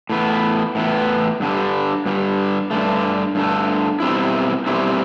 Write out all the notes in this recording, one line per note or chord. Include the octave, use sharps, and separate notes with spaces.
A2 E3 B3
A2 E3 B3
G2 D3 G3
G2 D3 G3
G2 D3 A3
G2 D3 A3
B2 G3 C4 E4
B2 G3 C4 E4